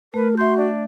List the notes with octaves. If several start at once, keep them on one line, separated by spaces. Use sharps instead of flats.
A3 A#4 B4
F#4 E5 C6 G6
D4